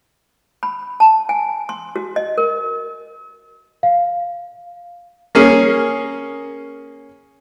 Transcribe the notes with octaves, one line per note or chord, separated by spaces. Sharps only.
B5
A5
G#5
C6
F#4
D#5
A#4
F5
A#3 C#4 G#4